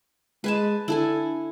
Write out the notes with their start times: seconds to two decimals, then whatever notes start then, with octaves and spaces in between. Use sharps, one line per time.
0.44 G#3 B4 G#5 A5
0.88 D3 E4 A4 G#5